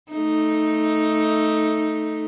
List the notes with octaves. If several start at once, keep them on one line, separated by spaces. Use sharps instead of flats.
A3 D#4